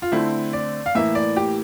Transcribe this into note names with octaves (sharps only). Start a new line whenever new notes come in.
F4
D3 A3 C4 E4
D5
F5
A2 E3 A#3 E5
D5
G4